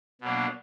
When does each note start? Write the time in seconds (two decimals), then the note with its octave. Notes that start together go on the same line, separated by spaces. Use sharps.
0.21 B2 F#3 A#3 D4